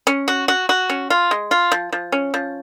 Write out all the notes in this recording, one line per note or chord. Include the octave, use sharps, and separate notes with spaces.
C#4
F#4
F#4
F#4
C#4
F4
G#3
F4
F3
F3
C#4
F3